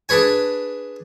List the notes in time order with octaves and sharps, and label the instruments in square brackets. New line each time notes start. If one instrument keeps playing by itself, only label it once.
[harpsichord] D4 G#4 B4 C#5 G#5